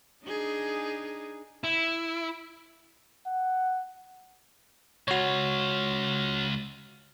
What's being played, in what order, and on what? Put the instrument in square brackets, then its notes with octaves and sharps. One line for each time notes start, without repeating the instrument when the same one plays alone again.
[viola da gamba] D4 D#4 G#4
[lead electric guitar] E4
[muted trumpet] F#5
[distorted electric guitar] C#2 F4 [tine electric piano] F#4 C#5